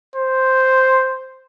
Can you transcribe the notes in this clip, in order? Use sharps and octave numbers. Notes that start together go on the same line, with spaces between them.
C5